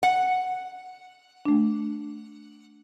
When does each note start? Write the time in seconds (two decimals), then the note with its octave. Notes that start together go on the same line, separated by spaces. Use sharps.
0.03 F#5
1.45 A3 D4